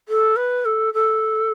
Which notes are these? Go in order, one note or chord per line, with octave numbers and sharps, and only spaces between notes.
A4
B4
A4
A4